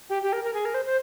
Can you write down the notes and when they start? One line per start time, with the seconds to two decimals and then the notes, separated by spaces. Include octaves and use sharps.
0.09 G4
0.22 G4
0.32 A#4
0.43 A#4
0.53 G#4
0.65 A#4
0.74 C5
0.85 C5